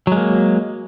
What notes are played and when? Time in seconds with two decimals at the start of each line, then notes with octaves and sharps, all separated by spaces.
0.07 F#3
0.12 G#3
0.16 A#3